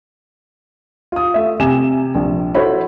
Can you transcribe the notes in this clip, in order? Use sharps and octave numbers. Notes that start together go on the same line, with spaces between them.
F4 D#6
A3 E5
C3 G4 G#5 E7
A#1
E4 F#4 A4 C5 C#5 B5